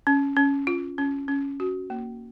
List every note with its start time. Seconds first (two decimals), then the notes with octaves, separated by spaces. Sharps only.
0.07 C#4
0.36 C#4
0.67 F4
0.98 C#4
1.28 C#4
1.60 F#4
1.90 A#3